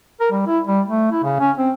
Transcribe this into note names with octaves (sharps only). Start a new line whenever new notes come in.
A#4
G3
E4
G3
A3
E4
C#3
C#4
C4